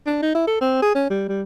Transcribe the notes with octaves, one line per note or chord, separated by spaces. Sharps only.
D4
D#4
E4
A4
C4
G#4
C#4
G3
G3